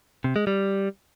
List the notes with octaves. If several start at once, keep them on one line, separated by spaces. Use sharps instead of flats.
C3
G#3
G3